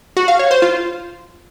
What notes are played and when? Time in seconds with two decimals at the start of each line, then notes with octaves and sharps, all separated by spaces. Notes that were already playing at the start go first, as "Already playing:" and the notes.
0.17 F#4
0.28 F5
0.39 C#5
0.51 C5
0.62 F4